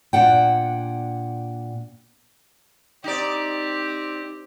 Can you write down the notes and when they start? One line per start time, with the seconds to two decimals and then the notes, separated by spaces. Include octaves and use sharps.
0.13 A#2 D4 F#5 G5
3.04 C4 D#4 G4 D5